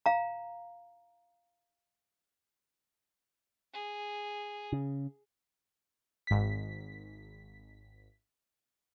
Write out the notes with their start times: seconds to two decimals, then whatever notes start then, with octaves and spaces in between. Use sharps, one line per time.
0.06 F5 A#5
3.73 G#4
4.73 C#3
6.27 G#1 B6